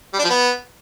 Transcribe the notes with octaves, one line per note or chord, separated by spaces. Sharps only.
G3
D4
F3
B3